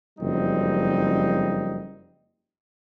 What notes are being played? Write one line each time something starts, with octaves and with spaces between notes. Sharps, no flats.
F#1 F2 G3 C4 D#4